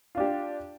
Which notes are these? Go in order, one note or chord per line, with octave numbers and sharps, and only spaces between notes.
D4 F4 G4